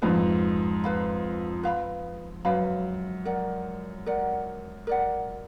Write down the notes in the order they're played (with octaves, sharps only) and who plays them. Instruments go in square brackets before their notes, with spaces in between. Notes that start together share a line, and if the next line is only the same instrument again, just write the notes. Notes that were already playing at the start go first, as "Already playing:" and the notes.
[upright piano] F2 G#2 [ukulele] B4 F5 B5
[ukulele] B4 F5 B5
B4 F5 B5
[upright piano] F#2 [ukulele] B4 F5 B5
[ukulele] A#4 D5 F#5
A#4 D5 F#5
A#4 D5 F#5